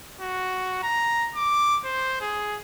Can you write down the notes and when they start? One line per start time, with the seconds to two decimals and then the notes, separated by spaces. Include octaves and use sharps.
0.21 F#4
0.83 A#5
1.35 D6
1.84 C5
2.21 G#4